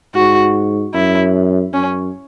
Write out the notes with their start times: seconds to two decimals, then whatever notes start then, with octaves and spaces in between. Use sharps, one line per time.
0.15 G#2 F#4
0.94 F#2 E4
1.73 F#2 C#4